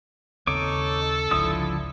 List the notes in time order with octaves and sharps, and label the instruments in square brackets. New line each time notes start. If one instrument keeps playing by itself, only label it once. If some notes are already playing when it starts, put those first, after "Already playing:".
[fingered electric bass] D#2 C#3 C4 [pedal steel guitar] D#4 C#5 D6 [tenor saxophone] A4
[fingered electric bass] G1 C#2 [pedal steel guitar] D3 F3 E4 [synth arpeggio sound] D#6